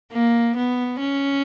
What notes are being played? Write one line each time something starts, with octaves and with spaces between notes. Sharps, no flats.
A#3
B3
C#4